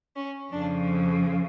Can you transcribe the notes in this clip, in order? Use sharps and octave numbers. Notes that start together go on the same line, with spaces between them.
C#4
F2 C#3 F3 D4